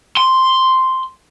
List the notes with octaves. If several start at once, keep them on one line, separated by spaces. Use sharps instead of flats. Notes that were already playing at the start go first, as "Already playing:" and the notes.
C6